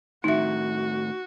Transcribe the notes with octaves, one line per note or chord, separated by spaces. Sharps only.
A2 D#3 D#4 F#4 E5